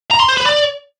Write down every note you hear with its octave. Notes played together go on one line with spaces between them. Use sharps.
A#5
C6
C5
B4
D5